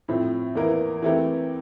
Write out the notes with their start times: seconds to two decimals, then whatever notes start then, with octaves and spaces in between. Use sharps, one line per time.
0.08 A2 F3 C4
0.55 E2 E3 A#3 E4 A#4
1.02 E3 A3 C4 G4 A#4